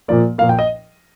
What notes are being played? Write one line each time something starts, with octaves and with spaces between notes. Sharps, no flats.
A#2 F3 A#3 D5
A#2 F3 A#3 F5
G5
D#5